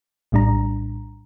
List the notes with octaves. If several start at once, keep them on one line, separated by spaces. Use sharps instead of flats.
A#1 A2 G3 D4 A#5